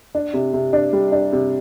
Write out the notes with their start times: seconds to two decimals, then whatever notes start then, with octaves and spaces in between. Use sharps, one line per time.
0.15 D4
0.34 C3
0.53 C3
0.73 D4
0.93 G3
1.12 D4
1.32 C3